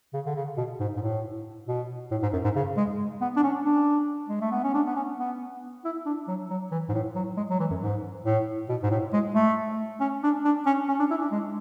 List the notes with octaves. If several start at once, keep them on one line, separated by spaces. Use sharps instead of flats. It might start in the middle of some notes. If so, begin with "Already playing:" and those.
C#3
D3
C#3
B2
G#2
G#2
A2
B2
A2
G#2
F#2
G#2
C#3
G#3
B3
D4
C#4
D4
G#3
A3
B3
C#4
D4
B3
C#4
B3
E4
D4
F#3
F#3
E3
G#2
A2
F#3
G#3
F#3
E3
F#2
G#2
A2
B2
G#2
A2
G#3
A3
C#4
D4
D4
C#4
C#4
D4
E4
D4
G#3